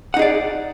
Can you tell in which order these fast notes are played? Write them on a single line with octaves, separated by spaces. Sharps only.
F#5 D#4 G#4 D5